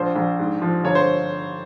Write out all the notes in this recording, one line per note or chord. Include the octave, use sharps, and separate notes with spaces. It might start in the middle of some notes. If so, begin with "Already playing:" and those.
Already playing: A#1 F3 C5
A#1
G#2
F3
G1 C#5
C5